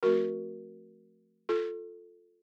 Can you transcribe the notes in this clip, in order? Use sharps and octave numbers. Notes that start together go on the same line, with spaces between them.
F3 A3 C4 F#4 A#4
F4 A4